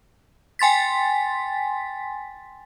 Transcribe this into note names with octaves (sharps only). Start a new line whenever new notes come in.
G5 G#5 C6 A6 B6